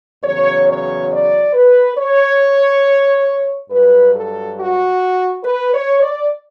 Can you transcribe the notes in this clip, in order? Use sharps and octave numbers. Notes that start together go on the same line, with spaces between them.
E2 C#3 F#3 C#5
C#5
D5
B4
C#5
G2 F#3 B4
A4
F#4
B4
C#5
D5